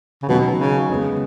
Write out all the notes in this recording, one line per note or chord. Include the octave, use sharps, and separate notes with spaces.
C#3
B2 D#3 F#3 C#4
C#3
C#3 G#3 B3